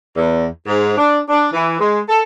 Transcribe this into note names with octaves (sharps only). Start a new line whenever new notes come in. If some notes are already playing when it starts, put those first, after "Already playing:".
E2
G#2
D4
D4
E3
G#3
A4